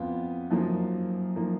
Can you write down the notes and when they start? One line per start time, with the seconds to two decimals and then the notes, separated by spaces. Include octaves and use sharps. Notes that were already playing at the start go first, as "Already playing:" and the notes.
Already playing: F2 B3 F4
0.51 F#2 F3 A#3 D#4
1.36 F3 A#3 D#4